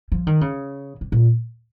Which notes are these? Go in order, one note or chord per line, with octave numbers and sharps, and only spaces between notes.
F3
D#3
C#3
C3
A#2